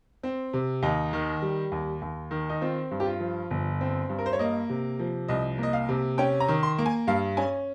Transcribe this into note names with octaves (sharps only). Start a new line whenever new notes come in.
C4
C3
D#2 D#4
D#3
G3
D#2
D#2
D#3
D#4
C4 F4
G2
G4
F4
F3
G1
C4
G2
A#4
C5
C#5
A#3 D#5
C3
F3
C2 D#5
A#3 D#5
F5
C3
C#4 G5
A#5
D#3
C6
A#3
G#5
G2 F5
C#4 G#5